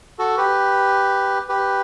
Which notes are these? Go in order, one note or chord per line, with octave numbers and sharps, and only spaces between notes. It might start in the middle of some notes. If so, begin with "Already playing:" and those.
F#4 A4
G4 B4
G4 B4